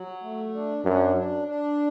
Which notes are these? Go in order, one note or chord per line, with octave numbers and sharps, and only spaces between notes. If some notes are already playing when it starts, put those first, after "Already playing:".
Already playing: F#3
A3
D4
F#2 D4
D4
D4